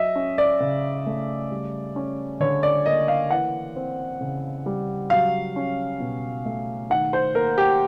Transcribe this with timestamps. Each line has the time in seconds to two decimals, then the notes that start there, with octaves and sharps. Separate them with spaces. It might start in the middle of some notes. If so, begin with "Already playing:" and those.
Already playing: F#3 D#5 E5
0.16 C#4
0.38 D5
0.61 C#3
1.06 A3
1.51 G3
1.96 C#4
2.40 D3 C#5
2.63 D5
2.86 A#3 D#5
3.08 F5
3.30 E3 F#5
3.76 C4
4.21 C#3
4.66 G3
5.10 F#3 F5
5.56 C#4
6.00 B2
6.45 A3
6.90 D#3 F#5
7.13 C5
7.35 A#3 A#4
7.58 G4